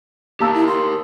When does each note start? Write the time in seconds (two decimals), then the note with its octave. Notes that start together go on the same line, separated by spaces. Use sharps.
0.40 A#3 G4 A#4 F5 A5 E6
0.54 E4
0.67 C6